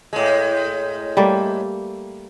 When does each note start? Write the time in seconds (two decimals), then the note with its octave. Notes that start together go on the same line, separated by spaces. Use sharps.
0.13 A2 G#3
1.17 G3 A3 A#3